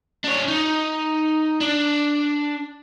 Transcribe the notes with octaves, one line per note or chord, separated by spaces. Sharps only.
D4 C#5
D#4
D4